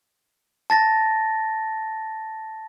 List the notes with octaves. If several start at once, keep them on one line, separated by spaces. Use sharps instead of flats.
A5 A6 A#6